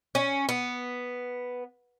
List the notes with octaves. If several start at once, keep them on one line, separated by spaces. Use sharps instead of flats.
C#4
B3